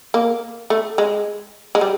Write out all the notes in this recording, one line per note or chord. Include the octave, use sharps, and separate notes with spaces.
A#3
A3
G#3
G#3
G3